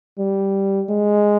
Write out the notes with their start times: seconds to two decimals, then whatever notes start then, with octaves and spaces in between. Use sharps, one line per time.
0.19 G3
0.90 G#3